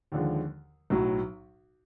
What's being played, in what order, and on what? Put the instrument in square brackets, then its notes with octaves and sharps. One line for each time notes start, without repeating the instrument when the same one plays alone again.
[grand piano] D#2 D3 F3 G#3
B1 A2 F#3